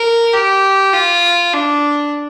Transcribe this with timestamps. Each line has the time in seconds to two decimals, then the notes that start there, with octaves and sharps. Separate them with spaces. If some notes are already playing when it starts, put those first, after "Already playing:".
Already playing: A#4
0.34 G4
0.93 F4
1.53 D4